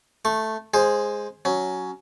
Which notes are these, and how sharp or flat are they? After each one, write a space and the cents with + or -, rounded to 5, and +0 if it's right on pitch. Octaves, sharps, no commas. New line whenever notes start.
A3 +0 C#6 -25
G#3 +0 G#4 +0 C5 +10
F#3 +5 C#4 +10